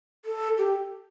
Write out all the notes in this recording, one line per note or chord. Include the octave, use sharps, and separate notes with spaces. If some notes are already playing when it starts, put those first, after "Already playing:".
A4
G4